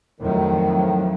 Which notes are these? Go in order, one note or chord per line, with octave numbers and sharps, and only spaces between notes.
F2 A2 D#3 F3 F#3